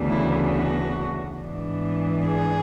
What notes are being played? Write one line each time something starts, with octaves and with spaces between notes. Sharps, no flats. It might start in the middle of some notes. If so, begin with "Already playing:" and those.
Already playing: D2 C#3 E3 B3 D4
E4
F#4
G#2 E3 B3 D4
G#4